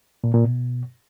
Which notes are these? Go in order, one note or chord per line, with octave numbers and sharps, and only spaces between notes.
A#2
A#2
B2